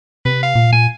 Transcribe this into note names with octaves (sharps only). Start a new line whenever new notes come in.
C3 B4
F5
A#2
A#2 G#5